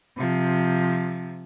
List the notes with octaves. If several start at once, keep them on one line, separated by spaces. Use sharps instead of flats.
C3 F3